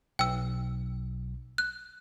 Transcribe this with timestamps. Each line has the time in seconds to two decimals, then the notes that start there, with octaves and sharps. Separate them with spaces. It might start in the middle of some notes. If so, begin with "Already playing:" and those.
0.19 B1 G5 E6
1.58 F#6